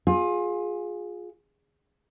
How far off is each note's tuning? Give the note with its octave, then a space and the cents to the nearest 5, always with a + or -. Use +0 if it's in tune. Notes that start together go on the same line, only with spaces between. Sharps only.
F4 +25 G#4 +0